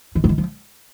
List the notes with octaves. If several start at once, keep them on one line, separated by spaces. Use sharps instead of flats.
D#3
D3
D#3
F3